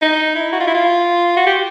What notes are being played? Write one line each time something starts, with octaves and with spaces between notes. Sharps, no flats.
D#4
E4
F#4
F4
E4
F4
F#4
G4